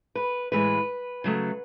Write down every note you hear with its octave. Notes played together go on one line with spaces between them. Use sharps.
B4
A2 E3 G#3 B4
C#3 F#3 A3